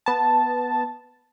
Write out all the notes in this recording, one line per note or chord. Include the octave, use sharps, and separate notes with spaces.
B3 A5